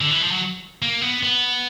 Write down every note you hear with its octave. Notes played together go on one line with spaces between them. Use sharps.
D3
E3
F3
F#3
A#3
B3
B3